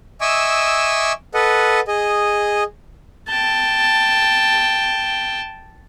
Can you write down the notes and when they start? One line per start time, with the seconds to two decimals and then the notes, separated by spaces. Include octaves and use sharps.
0.21 D#5 E5 G#5 C#6 D6 E6
1.34 A4 B4 D#5 F#5
1.88 G#4 D#5
3.28 G5 A5